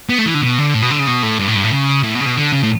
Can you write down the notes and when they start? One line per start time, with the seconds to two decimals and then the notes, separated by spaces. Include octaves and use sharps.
0.09 B3
0.18 A3
0.26 E3
0.34 D3
0.42 B2
0.59 D3
0.74 A2
0.82 B2
0.90 D3
0.99 C#3
1.07 B2
1.23 A2
1.39 G2
1.48 A2
1.55 G2
1.63 A2
1.72 C#3
2.03 A2
2.15 B2
2.21 C#3
2.26 B2
2.36 D3
2.52 C#3
2.63 A2